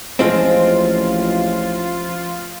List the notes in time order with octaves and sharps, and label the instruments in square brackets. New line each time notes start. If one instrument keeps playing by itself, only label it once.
[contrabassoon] A1 [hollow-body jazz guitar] F3 G#3 C4 [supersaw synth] F4